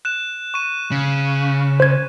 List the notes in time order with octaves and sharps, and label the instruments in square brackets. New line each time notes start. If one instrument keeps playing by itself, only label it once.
[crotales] F#6 E7
C#6 D#7
[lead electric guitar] C#3
[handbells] C5 G#6